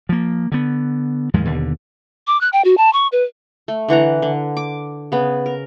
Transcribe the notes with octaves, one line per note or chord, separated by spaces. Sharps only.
F3 A#3
D3 B3
D#2 G#2 F3 G#3
D#2 B2 D3
D6
F#6
G5
F#4
A5
C#6
B4
A3
D3 E3 F#5 A#5
D3
D6
C#3 B3
A#4